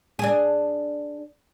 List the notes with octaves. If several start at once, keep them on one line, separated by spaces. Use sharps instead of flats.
D4 G#4